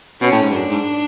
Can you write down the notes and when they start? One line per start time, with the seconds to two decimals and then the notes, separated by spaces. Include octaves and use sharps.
0.21 B2 C#4
0.32 A2
0.42 G#2
0.52 F#2 D4
0.69 G#2